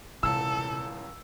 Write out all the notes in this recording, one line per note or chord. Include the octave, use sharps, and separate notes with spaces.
D#1 C#2 C3 E3 A4 E6